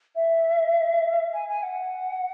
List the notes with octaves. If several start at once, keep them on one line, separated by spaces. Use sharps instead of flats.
E5
G#5
G#5
F#5